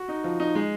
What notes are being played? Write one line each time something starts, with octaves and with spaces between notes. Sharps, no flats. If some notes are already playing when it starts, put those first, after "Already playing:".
Already playing: F#4
D#4
F3
D#4
G#3